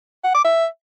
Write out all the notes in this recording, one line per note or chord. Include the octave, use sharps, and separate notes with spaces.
F#5
D6
E5